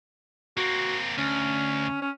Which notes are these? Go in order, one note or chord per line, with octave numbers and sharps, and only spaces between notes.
A#3 C4 F#4
D2 C#4
C#4